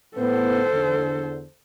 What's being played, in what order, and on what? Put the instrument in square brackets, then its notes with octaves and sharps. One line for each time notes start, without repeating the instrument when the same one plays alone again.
[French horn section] A2 B3 [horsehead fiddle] A4 C5
[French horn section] E2 D3